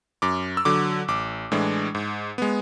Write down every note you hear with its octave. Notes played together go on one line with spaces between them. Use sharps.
F#2 D6
E6
D3 F#3 D6
A1 D6
A2 E3 G#3 D4
G#2
G#3 B3